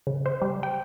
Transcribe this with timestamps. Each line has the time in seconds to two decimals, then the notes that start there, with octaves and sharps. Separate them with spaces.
0.07 C#3
0.26 C5
0.42 G3
0.63 G5